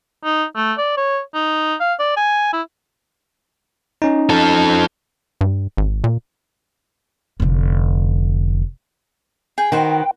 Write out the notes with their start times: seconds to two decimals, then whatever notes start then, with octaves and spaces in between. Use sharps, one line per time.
0.24 D#4
0.56 A3
0.78 D5
0.97 C#5
1.34 D#4
1.80 F5
1.99 D5
2.17 G#5
2.53 E4
4.02 C#4 D#4
4.29 F3 A4
5.41 G2
5.77 G#1
6.04 A#2
7.40 F1 D3
9.58 G#4 G5
9.72 D#3 F#4 B4 C5 G5